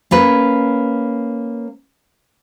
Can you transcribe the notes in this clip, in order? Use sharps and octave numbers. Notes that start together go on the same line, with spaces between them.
A#3 C#4 B4